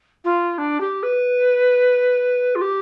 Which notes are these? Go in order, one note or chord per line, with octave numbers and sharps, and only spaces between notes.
F4
D4
G4
B4
F4
G4